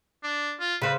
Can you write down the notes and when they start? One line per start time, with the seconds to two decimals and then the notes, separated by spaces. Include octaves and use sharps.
0.23 D4
0.60 F4
0.82 C#3 B4 C5